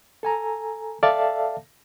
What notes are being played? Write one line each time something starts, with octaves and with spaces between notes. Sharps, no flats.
A4 G#5 A#5
A4 D5 E5 F5 A5